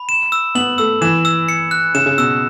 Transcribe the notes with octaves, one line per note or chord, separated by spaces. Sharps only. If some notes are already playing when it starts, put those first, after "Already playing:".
Already playing: B5
E7
E6
B3 F#7
A3 E6
E3 E7
E6
C#7
F#6
C#3 E7
C#3
B2 E6